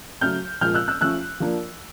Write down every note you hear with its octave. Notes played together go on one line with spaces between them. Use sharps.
C#3 F#3 A3 F6 G6
A#2 F3 G#3 F6 G6
E6 F#6
E6 F#6
F3 A3 C#4 E6 F#6
F3 A#3 D4